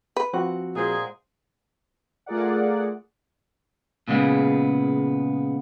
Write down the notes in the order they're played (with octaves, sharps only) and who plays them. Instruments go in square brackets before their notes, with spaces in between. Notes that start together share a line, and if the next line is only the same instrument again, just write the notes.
[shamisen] B4
[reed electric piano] F3 C4 F#4 [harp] F#5
[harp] A#2 C5 [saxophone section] G#3 G#4
[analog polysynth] A3 F4 G#4 A#4 D5 F#5
[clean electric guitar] A#2 C#3 G#3 B3